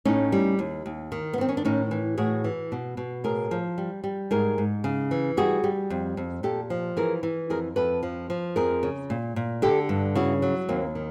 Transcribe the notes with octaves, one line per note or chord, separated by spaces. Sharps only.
A2 C#4 D#4
G3
D#2
D#2
D#3
B3
D#3 C4
C#4
D4
A2 C#4 D#4
E3
A2 F#4 G#4
E3
B2
B2
A2 G#4 A#4
F3
G3
G3
G#2 G#4 A#4
G#2
C#3
E3
G3 F#4 G#4
G3
F2
F2
A#2 G4 A4
F3
E3 G#4 A#4
E3
F2 G#4 A#4
F2 A4 B4
F3
F3
F2 G#4 A#4
C#3
A#2
A#2
D3 G4 A4
G2
C#3 E4 F#4
F#3
D#2 A#3 C4
D#3